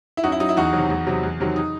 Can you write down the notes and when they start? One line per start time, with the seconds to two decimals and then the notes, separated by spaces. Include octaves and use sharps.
0.17 E4
0.23 F#2 D#4 F#4
0.32 E4
0.40 F#3 D#4
0.49 E4
0.57 E2 D#4 F#4
0.73 C3 D#3 F#3
0.90 E2
1.07 C3 F#3
1.23 E2
1.40 C3 D#3 F#3
1.56 D#4